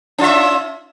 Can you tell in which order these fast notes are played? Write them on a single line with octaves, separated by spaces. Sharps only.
C#4 F4 E5